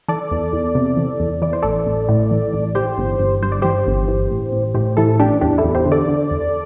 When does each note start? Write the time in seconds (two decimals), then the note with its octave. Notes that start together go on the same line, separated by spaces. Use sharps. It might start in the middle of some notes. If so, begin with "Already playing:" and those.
0.08 E3 A4 D5
0.31 E2
0.53 E2
0.75 C3
0.97 E3
1.20 E2
1.42 E3 D5
1.53 C5
1.62 A1 A4 D5
1.86 A1
2.09 A2
2.31 E3
2.53 A1
2.75 E3 G4 C5
2.98 G1
3.19 G1
3.43 G2 C5
3.52 D5
3.62 E3 G4 C5
3.87 G1
4.08 E3
4.31 A1
4.52 A1
4.75 A2 G4 C5
4.97 E3 E4 A4
5.20 A1 D4 G4
5.41 E2 D4 G4
5.58 E4 A4
5.65 E2
5.75 G4 C5
5.86 D3
5.92 A4 D5
6.08 D3
6.31 E2